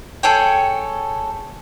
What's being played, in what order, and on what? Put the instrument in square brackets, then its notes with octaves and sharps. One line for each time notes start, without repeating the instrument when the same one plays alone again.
[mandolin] G#4 A4 C#5 G5